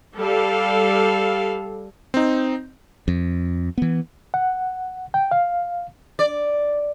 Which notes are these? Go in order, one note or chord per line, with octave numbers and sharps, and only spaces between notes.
G3 A4 F5
C4 D#4
F2
E3 B3
F#5
G5
F5
D5